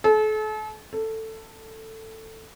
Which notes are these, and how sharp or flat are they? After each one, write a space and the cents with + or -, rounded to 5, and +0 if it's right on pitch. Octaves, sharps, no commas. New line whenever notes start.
A4 -40
A4 +10